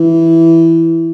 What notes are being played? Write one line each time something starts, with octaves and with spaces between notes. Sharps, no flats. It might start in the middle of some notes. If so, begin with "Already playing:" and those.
Already playing: E3